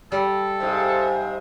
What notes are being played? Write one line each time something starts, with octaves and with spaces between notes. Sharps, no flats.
G3 A4
G#2 C3 E5 F5